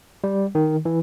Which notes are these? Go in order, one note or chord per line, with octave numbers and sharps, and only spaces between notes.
G3
D#3
E3